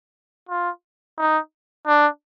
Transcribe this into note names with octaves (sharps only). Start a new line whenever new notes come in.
F4
D#4
D4